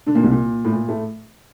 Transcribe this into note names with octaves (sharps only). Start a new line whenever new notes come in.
D3 D4
A#2 A#3
C2 C3
A#2
A2
A#2
A2 A3